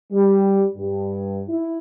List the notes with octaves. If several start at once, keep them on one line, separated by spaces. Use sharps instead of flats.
G3
G2
E4